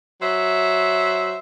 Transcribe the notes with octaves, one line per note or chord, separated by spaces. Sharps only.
F#3 C5 E5